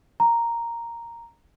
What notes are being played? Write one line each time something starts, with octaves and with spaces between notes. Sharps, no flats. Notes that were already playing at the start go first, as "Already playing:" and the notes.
A#5